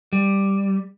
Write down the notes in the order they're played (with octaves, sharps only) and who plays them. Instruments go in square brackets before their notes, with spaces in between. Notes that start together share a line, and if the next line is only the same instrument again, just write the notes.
[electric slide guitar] G3